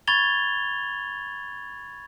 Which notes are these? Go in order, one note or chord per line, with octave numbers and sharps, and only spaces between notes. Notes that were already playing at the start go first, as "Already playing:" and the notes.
B5 C#6 G#6 A6 F7 G7